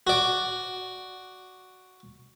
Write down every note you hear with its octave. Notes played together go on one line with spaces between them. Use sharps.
F#4 D5